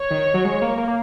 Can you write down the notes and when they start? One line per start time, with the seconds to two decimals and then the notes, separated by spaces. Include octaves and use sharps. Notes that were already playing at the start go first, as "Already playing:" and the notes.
Already playing: C#5
0.11 D#3
0.34 F#3
0.45 G#3
0.62 A#3
0.78 A#3
0.88 A#3